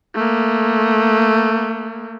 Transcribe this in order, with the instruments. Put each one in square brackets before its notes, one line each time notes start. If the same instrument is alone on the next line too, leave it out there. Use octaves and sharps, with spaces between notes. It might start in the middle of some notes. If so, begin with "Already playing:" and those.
[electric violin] A3 A#3